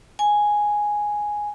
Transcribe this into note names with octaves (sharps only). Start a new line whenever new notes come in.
G#5